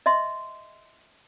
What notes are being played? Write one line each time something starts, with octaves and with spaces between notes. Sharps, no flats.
D#5 E5 C6